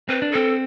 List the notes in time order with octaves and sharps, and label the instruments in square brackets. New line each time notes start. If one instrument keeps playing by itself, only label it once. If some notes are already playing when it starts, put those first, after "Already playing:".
[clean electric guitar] C4 [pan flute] B4
[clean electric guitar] D4
[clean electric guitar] C4 [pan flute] A4